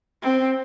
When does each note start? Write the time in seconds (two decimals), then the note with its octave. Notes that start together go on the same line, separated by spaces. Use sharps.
0.22 C4